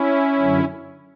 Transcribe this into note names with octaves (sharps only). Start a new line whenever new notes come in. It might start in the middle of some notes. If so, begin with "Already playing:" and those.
Already playing: C#4 E4
F#2 D3 F#3